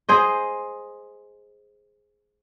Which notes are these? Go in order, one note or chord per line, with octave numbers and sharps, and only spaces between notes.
G#4 C5 D#5